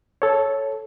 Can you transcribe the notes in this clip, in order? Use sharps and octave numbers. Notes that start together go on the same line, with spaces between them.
A4 C#5